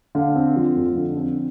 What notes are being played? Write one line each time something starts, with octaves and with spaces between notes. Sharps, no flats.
D3 F5
C4
F3
F2
D3
C4